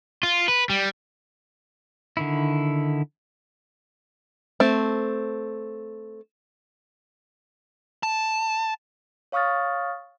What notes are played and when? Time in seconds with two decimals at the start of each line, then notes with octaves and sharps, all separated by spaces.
0.23 F4
0.48 B4
0.70 G3
2.17 D3 D#3 E4
4.60 A3 C4
8.03 A5
9.32 C#5 F5 C#6 D#6 F6 A6